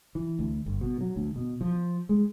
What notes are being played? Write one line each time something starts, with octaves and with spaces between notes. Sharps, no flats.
E3
D2
G1
B2
F#3
D2
B2
F3
G#3